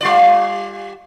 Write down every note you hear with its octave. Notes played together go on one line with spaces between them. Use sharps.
G3 F4 D5